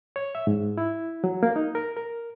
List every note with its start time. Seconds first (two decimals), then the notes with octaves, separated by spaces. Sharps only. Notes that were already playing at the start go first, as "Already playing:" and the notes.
0.16 C#5
0.35 E5
0.47 G#2
0.78 E4
1.24 F#3
1.43 A#3
1.56 D#4
1.75 A#4
1.97 A#4